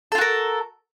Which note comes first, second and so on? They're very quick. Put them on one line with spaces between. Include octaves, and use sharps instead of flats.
A4 F4 F#4 A#4